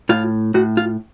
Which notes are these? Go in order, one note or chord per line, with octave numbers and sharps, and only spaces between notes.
A2 F4
A2 F#4
F4